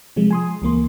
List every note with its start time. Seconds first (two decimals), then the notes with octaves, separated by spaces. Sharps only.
0.16 C3 F3 G#3
0.31 G#5 C6 D#6
0.62 C#2 E3 A#3 C6